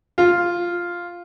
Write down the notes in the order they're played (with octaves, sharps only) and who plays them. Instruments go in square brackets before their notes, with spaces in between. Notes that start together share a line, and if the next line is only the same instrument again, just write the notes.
[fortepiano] F4